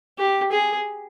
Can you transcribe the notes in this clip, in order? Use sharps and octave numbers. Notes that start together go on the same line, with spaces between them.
G4
G#4